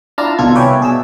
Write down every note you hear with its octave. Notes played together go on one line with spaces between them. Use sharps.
D4 E4 F4 F5 A5 A#5
C2 B2 D#3 F4 A4 G#6
B4 C#5 D5 E5 G5 G#5
B2 G#4 A5 E6